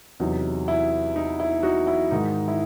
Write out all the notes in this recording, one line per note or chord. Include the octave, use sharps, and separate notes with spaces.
E2 C3 F#3 D#4
E4
D#4
E4
D#4 F#4
E4
G#2 D#3 G#3 D#4
E4